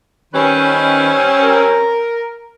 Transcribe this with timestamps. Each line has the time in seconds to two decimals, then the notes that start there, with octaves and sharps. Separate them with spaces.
0.33 D#3 G3 C4 C#4 B4
1.43 A#4